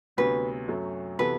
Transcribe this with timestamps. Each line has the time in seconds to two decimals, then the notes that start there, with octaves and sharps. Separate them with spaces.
0.17 D2 C3 F#3 B3 B4
0.68 F#2 F#3 A3
1.19 C3 E3 B3 F#4 A4 B4